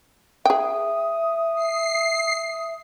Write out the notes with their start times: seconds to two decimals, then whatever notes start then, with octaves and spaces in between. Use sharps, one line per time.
0.45 G#4 E5 G5 D#6
1.55 C7